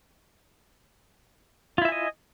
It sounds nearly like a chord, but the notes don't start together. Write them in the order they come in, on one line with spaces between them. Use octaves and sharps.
F4 E4 E5 G#5 D#5